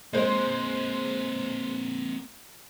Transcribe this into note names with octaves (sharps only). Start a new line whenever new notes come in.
G#3 A#3 C4 C5